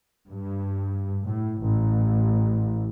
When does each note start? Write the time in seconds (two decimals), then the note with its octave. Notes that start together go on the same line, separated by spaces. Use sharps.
0.30 G2
1.24 A2
1.62 A1